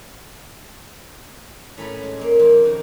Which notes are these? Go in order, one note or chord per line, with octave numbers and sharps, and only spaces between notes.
A2 A3 C#4 G#5 A#5 B5
G#3
A#2 G#3 A#3
F2 A#3 C4
D#3 F#4 A#4